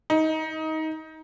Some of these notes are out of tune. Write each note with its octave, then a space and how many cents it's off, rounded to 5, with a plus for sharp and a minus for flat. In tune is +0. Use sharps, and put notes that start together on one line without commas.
D#4 +20